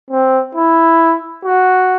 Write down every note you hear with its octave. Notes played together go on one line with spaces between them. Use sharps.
C4
E4
F#4